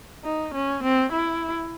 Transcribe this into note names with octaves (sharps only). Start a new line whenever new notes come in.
D#4
C#4
C4
E4